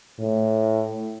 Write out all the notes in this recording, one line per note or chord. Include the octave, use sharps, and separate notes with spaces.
A2